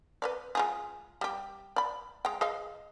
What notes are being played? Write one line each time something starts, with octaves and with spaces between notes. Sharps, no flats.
B4 C#5 D5
G#3 F4 G#4
G3 G4
D5 B5
G#3 G5
G#4 D#5 F5